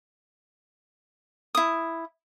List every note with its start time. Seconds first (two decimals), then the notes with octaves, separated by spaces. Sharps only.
1.55 E4 D#6